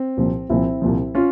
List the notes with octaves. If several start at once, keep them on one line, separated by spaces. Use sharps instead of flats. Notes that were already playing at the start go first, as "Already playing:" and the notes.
Already playing: C4
C2 A#2 F3
C2 A#2 F3 C4 E4
C2 A#2 F3
C#4 F4